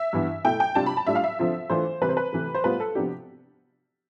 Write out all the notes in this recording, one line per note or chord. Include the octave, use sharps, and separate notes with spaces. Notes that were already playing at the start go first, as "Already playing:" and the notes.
Already playing: E5
G2 E3 B3 E4
B2 A3 E4 G5
G5
C3 G3 D4 F4 A5
B5
A5
A2 G3 D4 F4 E5
F5
E5
D3 F3 C4 F4
E3 A3 D4 F4 C5
C3 E3 G3 C4 B4
C5
B4
C3 E3 A3
C5
A2 G3 B3 F4 B4
A4
C3 F3 B3 D4 G4